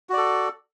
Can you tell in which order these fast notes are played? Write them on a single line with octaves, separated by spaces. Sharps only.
F#4 D5 A4